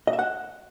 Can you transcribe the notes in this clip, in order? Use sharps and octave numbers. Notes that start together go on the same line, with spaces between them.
D#5
E5
F#5